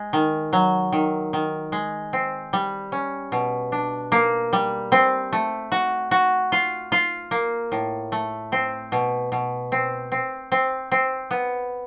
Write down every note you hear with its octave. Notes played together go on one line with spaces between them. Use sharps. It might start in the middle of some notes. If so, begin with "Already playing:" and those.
Already playing: G#3
D#3
F#3
D#3
D#3
G#3
C4
G3
C#4
B2
D4
A#3
G3
C4
A3
F#4
F#4
F4
F4
A#3
A2
A3
C4
B2
B2
C4
C4
C4
C4
B3